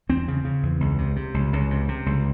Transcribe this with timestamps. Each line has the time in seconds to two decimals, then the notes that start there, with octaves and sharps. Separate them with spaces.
0.09 E2 C4
0.28 C#3
0.45 C#3
0.63 E2
0.80 C#2
0.98 C3
1.16 C3
1.34 C#2
1.53 C#2
1.71 C3
1.88 C3
2.06 C#2